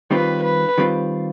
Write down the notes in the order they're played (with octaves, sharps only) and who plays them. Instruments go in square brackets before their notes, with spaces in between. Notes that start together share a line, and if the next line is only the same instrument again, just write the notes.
[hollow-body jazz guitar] D#3 G3 C4 F4 [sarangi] B4
[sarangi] B4
[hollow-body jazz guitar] D#3 G3 C4 F4